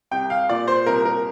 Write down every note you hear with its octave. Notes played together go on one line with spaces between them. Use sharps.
C2 G5
F5
A#2 D5
C5
C2 A#4
A#4